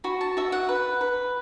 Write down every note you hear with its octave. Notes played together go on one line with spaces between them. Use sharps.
F#4 B5
A5
F#4 E5
F#5
B4
B4